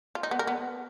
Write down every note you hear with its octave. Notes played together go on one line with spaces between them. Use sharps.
F4
D#4
B3
A#4
B3